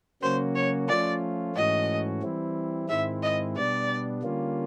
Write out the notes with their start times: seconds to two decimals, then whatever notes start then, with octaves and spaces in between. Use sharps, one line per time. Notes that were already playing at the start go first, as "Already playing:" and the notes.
0.22 C#3 F#3 A#3 C#4 F#4 C5
0.55 C#5
0.88 F3 A3 C#4 F4 D5
1.56 G#2 E3 A3 C#4 F#4 D#5
2.22 E3 G3 C4 E4
2.89 G#2 D#3 G#3 C4 E4 E5
3.23 D#5
3.56 B2 G3 B3 D4 D5
4.23 D3 G3 A#3 C#4 F4